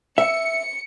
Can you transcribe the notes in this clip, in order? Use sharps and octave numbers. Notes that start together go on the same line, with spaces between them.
E5 C#7